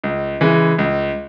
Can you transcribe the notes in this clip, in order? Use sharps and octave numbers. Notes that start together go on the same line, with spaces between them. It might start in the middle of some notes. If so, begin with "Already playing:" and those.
C#2
C#3 E3 G#3
C#2